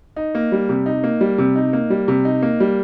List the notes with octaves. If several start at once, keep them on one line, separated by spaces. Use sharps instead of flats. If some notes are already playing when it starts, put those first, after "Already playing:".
D#4
A#3
G3
C3
D#4
A#3
G3
C3
D#4
A#3
G3
C3
D#4
A#3
G3